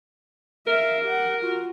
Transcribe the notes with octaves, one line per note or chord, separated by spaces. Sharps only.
A#4 E5 F5
G4 F#5
F4 F#4